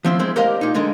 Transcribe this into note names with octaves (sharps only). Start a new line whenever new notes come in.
F3 C4 E4
G#3 C4 E4
G4 A#4 C5 D5 D#5 F5
A#2 D#4
D3 G#3 A#4 D#5